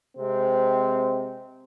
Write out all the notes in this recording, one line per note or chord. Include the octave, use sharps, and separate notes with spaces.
C3 G#3 C4